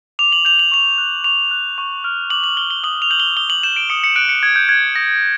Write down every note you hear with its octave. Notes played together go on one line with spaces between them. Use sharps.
D6 F7
F#7
G6 F7
F#7
C#6 F7
F#6
C#6 F7
F#6
C#6
F6
D6 F#7
F#7
F6 G7
G7
D#6 F#7
F7
G6 F#7
G7
D#6 G7
F#7
G6 E7
D7
D#6 C#7
C#7
F#6 D7
C#7
D#6 G#6
G6
F#6 G#6
D#6 A#6